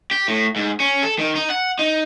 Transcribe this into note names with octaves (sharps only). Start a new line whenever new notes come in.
G4
A2
G#2
C#4
A4
D#3
D#4
F#5
D#4